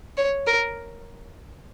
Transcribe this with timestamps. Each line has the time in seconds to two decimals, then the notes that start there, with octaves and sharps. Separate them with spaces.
0.17 C#5
0.47 A#4